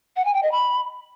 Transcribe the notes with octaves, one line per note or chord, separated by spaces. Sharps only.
F#5
G#5
G5
D#5
B5